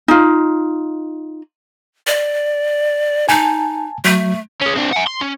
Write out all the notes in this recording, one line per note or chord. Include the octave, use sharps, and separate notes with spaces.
D#4 F4
D5
D#4 G#5 A5
F#3 A3
G#3 C#4
C4 D4
F#5 G#5
C6
C#4